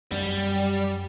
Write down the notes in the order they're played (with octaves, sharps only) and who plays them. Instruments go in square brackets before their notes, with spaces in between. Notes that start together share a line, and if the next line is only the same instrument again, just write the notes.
[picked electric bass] F#2 [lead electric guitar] G3